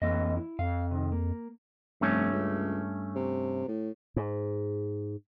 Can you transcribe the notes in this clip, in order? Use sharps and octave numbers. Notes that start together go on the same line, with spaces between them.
F2 E3 A#3 D#5
E4
F2 F5
C3 D#3
A#3
F1 G2 A3 C#4
C#2
C3
A2
G#2